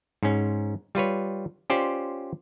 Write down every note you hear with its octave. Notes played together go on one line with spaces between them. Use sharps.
G#2 C#4
G3 F4 B4 C#5
C#4 F4 G4 C5 D5